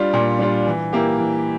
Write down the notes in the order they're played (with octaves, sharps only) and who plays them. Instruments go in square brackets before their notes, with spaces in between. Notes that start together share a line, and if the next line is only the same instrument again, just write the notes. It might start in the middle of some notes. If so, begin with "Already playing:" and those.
Already playing: [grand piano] G3 D4 F4
A#2
G3 D4 F4
E3
A#3 E4 G4
E3